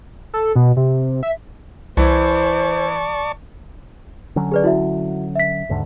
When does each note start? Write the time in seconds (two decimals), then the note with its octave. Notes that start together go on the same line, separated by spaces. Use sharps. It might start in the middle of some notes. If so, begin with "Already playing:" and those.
0.34 A4
0.56 B2
0.77 C3
1.23 E5
1.97 C2 E3 E4 C5 D5 A5 C#6
4.36 D3 F#3 C#4
4.52 G#4 B4 D5
4.64 E4 F#4 E5
5.35 E5 B6
5.69 D#2 G#2 D3